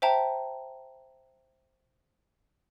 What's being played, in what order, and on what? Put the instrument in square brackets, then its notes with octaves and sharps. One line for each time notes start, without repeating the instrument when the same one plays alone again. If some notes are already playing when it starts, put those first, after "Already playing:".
[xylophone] C5 E5 G5 A5 A#5